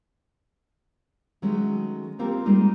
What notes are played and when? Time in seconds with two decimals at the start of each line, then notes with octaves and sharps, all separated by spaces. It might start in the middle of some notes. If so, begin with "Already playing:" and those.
1.42 D#3 F#3 G#3 A3 C#4
2.19 A#3 C4 F4 G4 A4 A#4
2.45 G3 G#3 A#3 D#4 F4